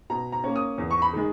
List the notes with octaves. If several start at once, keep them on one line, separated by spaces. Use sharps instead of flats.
B2 A#5
A#5
A#3 C#4
D#6
E2
C#6
B5
D#3 G#3